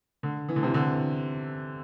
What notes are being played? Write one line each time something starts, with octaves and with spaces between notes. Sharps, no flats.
D3
E3
D3
C3 E3
D3